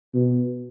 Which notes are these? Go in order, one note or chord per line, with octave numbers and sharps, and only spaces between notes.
B2